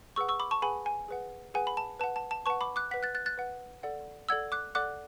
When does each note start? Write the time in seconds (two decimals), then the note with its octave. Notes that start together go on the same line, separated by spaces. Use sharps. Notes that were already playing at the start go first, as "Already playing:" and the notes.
0.16 G#4 B4 F#5 C#6 E6
0.29 C#6 E6
0.40 B5 D6
0.51 A5 C#6
0.62 G#4 B4 F#5 G#5 B5
0.86 G#5
1.08 G#4 B4 F#5
1.54 G#4 B4 F#5 G#5
1.67 B5
1.77 A5
2.00 B4 A5
2.04 F#5
2.16 A5
2.31 A5
2.46 B4 A5 C#6
2.50 F#5
2.61 B5 D6
2.76 D6 F#6
2.91 B4 F#5 B6
3.03 F#6 A6
3.15 F#6 A6
3.26 F#6 A6
3.38 B4 F#5
3.83 A4 D5 F#5
4.29 A4 D5 F#5 E6 G#6
4.52 D6 F#6
4.75 A4 D5 F#5 D6 F#6